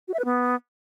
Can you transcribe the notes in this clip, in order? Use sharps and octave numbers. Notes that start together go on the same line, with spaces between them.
F#4
E5
B4
B3